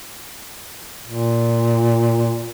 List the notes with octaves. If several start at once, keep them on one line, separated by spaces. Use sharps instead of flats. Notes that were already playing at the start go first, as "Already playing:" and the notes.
A#2